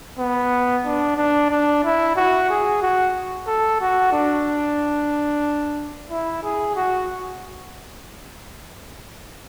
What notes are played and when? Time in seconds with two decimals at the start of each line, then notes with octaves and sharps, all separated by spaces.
0.19 B3
0.86 D4
1.17 D4
1.50 D4
1.84 E4
2.16 F#4
2.50 G#4
2.82 F#4
3.47 A4
3.81 F#4
4.13 D4
6.10 E4
6.43 G#4
6.76 F#4